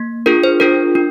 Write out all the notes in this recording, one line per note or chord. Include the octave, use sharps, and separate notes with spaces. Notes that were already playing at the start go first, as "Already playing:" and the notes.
Already playing: A#3
D4 F4 G#4 A#4
C5
D4 F4 G#4 A#4
D4